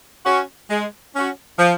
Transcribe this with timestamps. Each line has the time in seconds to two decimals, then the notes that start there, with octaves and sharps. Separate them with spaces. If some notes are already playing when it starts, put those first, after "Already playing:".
0.26 C#4 F#4
0.70 G#3
1.15 C#4 F#4
1.59 F3